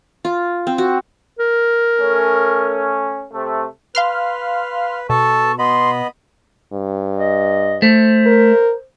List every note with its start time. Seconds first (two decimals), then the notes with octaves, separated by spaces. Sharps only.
0.25 F4
0.67 C4
0.78 F#4
1.40 A#4
2.00 A3 C#4
3.33 C3 A3
3.95 B4 F5 C6 F6
5.09 B2 A4 A5 C#6
5.59 B3 D#5 B5 C6
6.73 G2
7.16 D#5
7.82 A3 C5
8.27 A#4